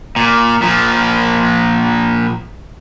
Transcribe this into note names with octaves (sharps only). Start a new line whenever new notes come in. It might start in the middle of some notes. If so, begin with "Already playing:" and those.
A#2
A#2 F3